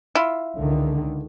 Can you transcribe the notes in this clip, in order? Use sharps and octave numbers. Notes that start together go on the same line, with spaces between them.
E4 F4
C#2 D3 D#3